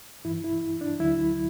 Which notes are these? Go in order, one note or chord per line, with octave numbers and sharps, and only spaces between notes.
G2 E3 E4
E4
D4
D2 D3 F#3 E4